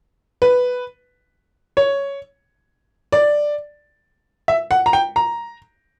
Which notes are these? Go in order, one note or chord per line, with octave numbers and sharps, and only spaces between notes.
B4
C#5
D5
E5
F#5
A#5
G5
A#5